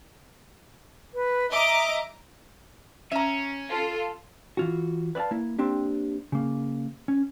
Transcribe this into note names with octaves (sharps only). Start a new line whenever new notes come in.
B4
D#5 E5 A#5 D6
C#4 E5 A#5
F4 A4
E3 F4 F#4
B4 D5 E5 F5 A5
A#3 E4
A#3 C4 D4 G4
C#3 A#3
C#4